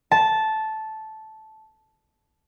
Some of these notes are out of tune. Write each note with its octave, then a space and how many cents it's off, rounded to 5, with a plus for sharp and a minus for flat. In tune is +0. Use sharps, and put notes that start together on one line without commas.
A5 -10